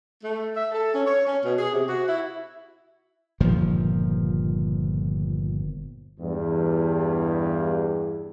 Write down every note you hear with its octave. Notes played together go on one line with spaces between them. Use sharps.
A3
E5
A4
C#4
C#5
C#4
B2
G#4
C3
F#4
E4
G1 A#2 D#3 F3
E2 G2